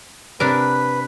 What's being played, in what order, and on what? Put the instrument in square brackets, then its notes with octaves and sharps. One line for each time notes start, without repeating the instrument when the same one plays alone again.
[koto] C3 D4 A#4 [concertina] B4